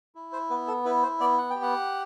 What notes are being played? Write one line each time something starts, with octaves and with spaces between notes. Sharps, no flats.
E4
C5
B3 B4
A4
E4 B4
C5
B3 D5
F#5
G5
G4
F#5